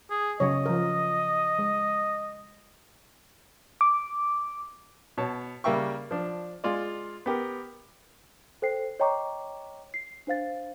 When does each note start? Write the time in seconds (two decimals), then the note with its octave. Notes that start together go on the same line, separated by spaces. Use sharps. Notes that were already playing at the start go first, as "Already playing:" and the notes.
0.11 G#4
0.40 C#3 F#3 C#5 D#5
0.66 F3 A#4
1.59 G#3
3.81 D6
5.18 B2 C#5 A5
5.64 C#3 G3 A#3 E5 G5 C#6
6.11 F3 D4
6.64 G#3 F4 D5
7.26 B3 G4 A#4
8.62 A4 C5 G5 C7
9.00 C#5 D#5 G5 A#5 C#6 D6
9.94 C7
10.27 D4 C5 F5 A6